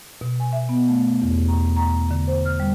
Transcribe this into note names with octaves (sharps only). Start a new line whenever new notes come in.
B2
G#5
E5
B3
A3
E2
A#5
A#5
D3
C5
F6
G3